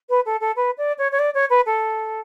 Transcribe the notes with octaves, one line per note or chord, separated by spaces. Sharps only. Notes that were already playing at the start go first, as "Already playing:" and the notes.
B4
A4
A4
B4
D5
C#5
C#5
D5
C#5
B4
A4